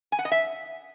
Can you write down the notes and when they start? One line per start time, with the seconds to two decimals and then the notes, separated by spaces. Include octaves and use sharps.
0.12 G#5
0.19 F#5
0.25 D#5
0.32 E5